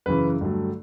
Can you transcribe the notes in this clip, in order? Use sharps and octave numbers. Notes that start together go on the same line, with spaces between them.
F#2 C#3 E3 B4
G2 D3 F#3 A3